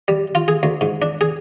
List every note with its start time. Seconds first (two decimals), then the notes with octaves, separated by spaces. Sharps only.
0.08 G3
0.35 F4
0.48 G#4
0.63 D2
0.81 G#2
1.02 D4
1.21 G#4